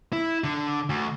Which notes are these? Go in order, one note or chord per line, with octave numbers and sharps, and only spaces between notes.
E4
D3
D2